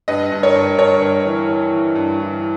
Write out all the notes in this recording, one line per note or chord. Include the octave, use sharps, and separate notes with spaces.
G2 B4 D#5
G2
A#4 C#5
G2
G2 A#4 C#5
G2
E3
E3
E3
G2
E3